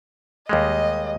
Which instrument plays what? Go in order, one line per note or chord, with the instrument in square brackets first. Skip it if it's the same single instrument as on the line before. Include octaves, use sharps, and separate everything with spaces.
[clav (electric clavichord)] D#2 G3 G#3 [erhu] D#5